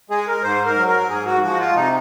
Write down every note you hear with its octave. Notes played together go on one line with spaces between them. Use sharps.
G#3 G#4
A#4
G#2 C5
A#4
F#3
A#4
G#2 G#4
F#4
F3 G#3 F#4
F4
C3 D#4